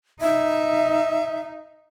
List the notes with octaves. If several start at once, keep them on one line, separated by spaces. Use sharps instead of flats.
D#4 E5